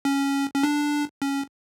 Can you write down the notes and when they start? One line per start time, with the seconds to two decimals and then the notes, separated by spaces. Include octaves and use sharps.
0.05 C#4
0.54 C#4
0.63 D4
1.22 C#4